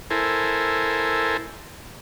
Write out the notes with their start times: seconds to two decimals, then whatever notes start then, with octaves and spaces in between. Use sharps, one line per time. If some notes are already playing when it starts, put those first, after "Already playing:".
0.10 E4 A4 A#4 C5 G#5